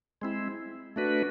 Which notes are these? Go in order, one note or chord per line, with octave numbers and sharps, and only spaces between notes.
G#3 C4 E4
A3 D4 F#4 B4